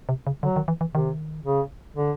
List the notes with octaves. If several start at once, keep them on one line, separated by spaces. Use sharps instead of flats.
C3
C#3
D3 F#3
D#3
E3
E3
C3 D#3
C#3
D3